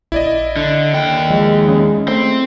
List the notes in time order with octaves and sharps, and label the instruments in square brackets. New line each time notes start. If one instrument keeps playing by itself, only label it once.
[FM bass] A#1 [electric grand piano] E4 D5 D#5
[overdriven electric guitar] D3
D#2 G5
[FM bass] F3 [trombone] G#3
[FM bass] C#4
[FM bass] A3 [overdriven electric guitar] C4 C5